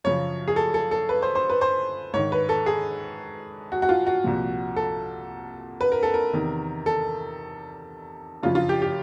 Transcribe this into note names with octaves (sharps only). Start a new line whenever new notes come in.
F#2 C#3 F3 C#5
G#4
A4
A4
A4
B4
C5
C5
B4
C5
G#2 D#3 C#5
B4
A4
G#4
F#4
F#4
F4
F#4
C2 A#2 F3
A4
B4
A#4
A4
A#4
E2 C3 D#3
A4
F#2 C#3 F3 F4
F4
G4
G4